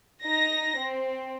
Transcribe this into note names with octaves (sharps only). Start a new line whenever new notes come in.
D#4 A#6
C4